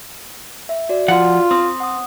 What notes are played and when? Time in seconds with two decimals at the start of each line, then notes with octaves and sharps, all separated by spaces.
0.69 E5
0.89 F#4 D5
1.08 F3 F4 F#5
1.51 C4 D#6
1.80 F#5 D#6